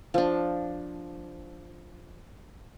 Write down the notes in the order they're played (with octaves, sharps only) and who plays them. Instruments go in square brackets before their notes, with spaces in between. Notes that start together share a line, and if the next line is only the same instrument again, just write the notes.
[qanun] F3 D4